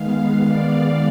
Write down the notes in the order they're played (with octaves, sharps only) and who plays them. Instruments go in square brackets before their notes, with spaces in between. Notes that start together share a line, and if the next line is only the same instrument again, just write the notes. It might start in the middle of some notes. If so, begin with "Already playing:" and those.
Already playing: [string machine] D#3 G#3 B3 F5
D5